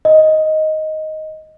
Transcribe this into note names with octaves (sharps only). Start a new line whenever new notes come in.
D#5